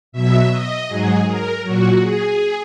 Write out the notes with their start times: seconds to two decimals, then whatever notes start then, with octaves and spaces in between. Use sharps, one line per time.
0.12 B2 F#3 E5
0.50 D#5
0.88 G#2 F#3 G#4
1.25 A#4
1.63 A#2 F#3 F#4
2.01 G#4